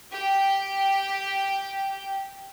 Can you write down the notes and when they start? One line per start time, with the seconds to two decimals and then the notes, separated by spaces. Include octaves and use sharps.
0.11 G4 G5